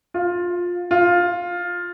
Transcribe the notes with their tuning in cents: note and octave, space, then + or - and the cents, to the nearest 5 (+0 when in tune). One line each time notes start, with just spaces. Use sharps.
F4 +15
F4 +10